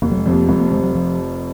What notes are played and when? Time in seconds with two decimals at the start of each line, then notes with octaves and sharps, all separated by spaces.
0.02 F1 A#3
0.11 F#3
0.18 G#3
0.26 F2 C3 F3
0.33 A#3
0.49 F1 G#3
0.60 A#3
0.72 F2 C3 F3 G#3
0.83 F#3
0.95 F3